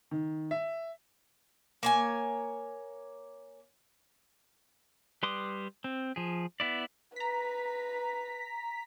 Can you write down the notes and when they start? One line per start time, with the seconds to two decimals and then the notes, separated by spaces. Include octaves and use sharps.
0.11 D#3
0.51 E5
1.83 A#3 C#5 G#5
5.23 G3 B4 C6 D6 D#6
5.84 C4
6.16 F3 G#4
6.60 B3 E4 D5
7.16 B4 A#5 B6